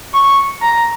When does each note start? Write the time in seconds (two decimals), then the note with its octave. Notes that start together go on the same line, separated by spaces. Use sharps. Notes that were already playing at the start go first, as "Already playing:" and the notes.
0.14 C#6
0.62 A#5